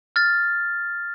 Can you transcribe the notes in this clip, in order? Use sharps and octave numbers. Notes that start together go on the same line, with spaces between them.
F6 A6